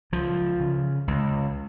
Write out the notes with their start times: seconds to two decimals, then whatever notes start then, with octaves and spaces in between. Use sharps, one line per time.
0.12 C#2 F3
0.60 C#3
1.08 C#2